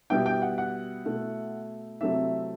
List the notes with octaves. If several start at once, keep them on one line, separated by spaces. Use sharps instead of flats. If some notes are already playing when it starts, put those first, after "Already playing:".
B2 G3 B3 E4 G5
G5
F#5
F#5
B2 A3 E4
C3 F#3 A3 C4 E4 E5